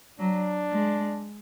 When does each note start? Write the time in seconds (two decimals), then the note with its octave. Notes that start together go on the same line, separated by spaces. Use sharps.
0.19 F#3 D4
0.72 G#3